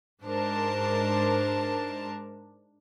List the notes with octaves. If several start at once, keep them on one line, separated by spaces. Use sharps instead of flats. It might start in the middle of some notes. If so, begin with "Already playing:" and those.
G#2 D4 A#4 C5 A5